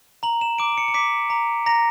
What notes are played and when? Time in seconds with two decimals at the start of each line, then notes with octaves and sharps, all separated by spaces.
0.23 A#5 F#7
0.41 E7
0.58 D6 D7
0.72 D7
0.78 C#7
0.88 C#7
0.94 D6 B6
1.30 A#5
1.66 A#5 A#6